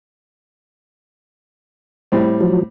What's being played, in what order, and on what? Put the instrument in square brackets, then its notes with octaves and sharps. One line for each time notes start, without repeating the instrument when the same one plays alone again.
[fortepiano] A2 G3 C4
[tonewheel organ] F3 F#3